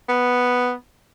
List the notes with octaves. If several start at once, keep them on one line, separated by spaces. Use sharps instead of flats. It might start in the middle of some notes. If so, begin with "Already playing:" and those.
B3